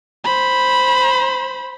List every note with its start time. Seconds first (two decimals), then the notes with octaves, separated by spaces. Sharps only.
0.25 C5 B5